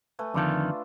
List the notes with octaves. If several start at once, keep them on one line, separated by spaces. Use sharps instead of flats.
A3 B4 G#5
F2 D3 D#3 D4 F4 A4